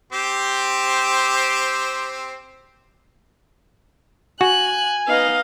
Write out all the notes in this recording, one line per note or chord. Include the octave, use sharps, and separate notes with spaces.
C4 G4 C5
F#4 G#5 F#6
B3 D#4 D#5 F5